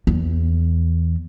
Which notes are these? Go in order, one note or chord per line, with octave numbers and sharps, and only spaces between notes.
E2